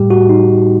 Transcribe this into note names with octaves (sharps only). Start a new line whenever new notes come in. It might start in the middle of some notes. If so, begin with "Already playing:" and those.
Already playing: A2 G3 G4
F#4
D#4